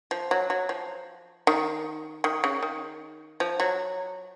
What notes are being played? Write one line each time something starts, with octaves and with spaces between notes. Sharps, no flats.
F3
F#3
F#3
F3
D#3
D#3
C#3
D#3
F3
F#3